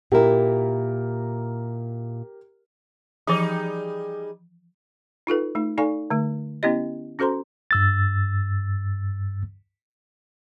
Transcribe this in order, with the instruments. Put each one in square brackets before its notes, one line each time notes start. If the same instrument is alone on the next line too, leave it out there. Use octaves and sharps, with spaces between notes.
[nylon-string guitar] A#2 E4 [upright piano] G4 A#4
[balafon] E3 F3 [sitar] G3 D#4 G#4
[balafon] D#4 F4 A4 B4
A3 D#4
D#4 A4 D5 F5 G#5 C#6
D3 A3
B3 C#4 E4 G4 D#5
C#4 F#4 A4 C5 A#5 C6
[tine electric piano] G2 E6 A6